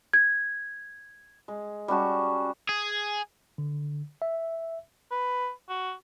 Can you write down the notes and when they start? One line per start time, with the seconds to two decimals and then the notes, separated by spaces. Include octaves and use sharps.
0.13 G#6
1.48 G#3
1.88 G3 C#4 F#4 A5
2.69 G#4
3.58 D3
4.22 E5
5.11 B4
5.69 F#4